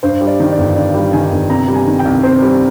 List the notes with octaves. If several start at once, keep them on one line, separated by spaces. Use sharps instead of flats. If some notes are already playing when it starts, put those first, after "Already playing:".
G2 C5
G3
D5
D#3
D5
G1
G2 D5
G3
D#3 G#5
G1
C3 A#5
G3
G#5
D#3
G5
C2
C3 C5
G3